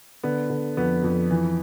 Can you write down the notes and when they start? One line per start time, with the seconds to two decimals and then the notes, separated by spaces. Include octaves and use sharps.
0.23 D3 B3
0.50 D3
0.77 F2 B3
1.04 F2
1.31 E3